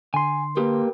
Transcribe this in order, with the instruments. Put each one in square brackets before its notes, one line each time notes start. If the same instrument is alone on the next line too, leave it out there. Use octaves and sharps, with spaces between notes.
[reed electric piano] D3 C6 [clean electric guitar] G#5
[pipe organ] A#3 [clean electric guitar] G4 B4